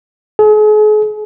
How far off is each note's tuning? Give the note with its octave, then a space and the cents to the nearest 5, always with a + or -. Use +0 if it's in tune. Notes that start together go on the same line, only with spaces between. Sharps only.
G#4 +40